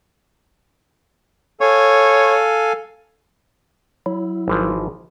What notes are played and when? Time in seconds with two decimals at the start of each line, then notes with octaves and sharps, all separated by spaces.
1.61 A4 C#5 F5 G#5
4.06 F#3 E4
4.48 G#1 E3 F3